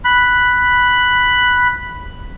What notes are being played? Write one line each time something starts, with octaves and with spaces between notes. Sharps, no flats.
B5 F#6